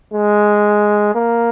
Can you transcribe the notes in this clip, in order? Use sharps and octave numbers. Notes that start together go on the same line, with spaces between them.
G#3
A#3